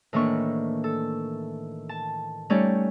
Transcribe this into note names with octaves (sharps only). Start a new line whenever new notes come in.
A2 D#3 E3 A#3 D4 C#6
A4
A5
G3 A3 C#4 D#4 C#5 D5